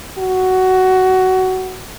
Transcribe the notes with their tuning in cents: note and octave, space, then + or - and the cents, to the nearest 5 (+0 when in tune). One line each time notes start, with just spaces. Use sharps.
F#4 +15